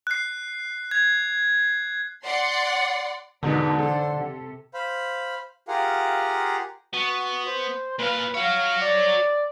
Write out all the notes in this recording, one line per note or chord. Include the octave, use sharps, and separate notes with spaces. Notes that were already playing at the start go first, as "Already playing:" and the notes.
F#6 C7
G#6
D5 F#5 C6
E2 G#2 B2 D3 D#4 A#4 B4
D4 A4 C5
C3
C5 F5 B5
F4 G4 G#4 A#4 F5 F#5
B3 F#4
C5
A#2 B4 F5
F#4 C#5 F5
D5